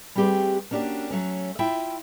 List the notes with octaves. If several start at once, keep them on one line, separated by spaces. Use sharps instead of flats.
G3 A3 C4 G4 G#4 B4
A#3 C#4 D4 F#4 G4
F#3 A3 C#4
E4 F4 E5 G5